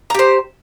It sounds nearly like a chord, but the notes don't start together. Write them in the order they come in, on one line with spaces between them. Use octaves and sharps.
A#5 G4 C5